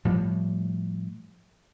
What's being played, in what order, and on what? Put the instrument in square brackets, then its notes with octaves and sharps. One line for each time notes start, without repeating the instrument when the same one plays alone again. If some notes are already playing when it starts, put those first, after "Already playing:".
[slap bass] A2 F3 G3